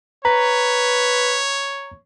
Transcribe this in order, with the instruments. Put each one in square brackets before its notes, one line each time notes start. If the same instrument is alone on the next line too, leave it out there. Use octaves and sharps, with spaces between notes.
[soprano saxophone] B4 [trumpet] C#5 [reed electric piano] A#5